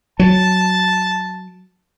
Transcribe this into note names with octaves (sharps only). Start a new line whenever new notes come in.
F#3 A5